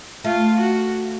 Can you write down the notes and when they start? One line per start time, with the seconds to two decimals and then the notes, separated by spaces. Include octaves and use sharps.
0.24 A3 F4
0.59 F#4